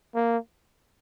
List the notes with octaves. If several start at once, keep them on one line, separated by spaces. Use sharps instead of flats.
A#3